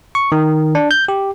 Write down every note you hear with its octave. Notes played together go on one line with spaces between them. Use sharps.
C#6
D#3
D4
G6
G4